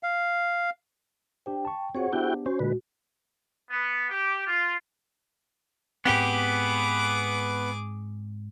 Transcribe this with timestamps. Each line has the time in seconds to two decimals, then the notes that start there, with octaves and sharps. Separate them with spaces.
0.03 F5
1.46 D4 G4 C5 G5
1.65 A5 C#6
1.95 C4 F4 F#4 G#4 C5 C#5 F#5
2.13 B3 D4 E4 F#4 G4 G5
2.46 C#4 F#4 C5
2.59 A#2 D3 G#3 B4
3.70 B3
4.10 G4
4.46 F4
6.05 G#2 B3 C4 G4 G#4 D6